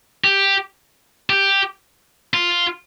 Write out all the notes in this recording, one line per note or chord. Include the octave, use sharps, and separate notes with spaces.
G4
G4
F4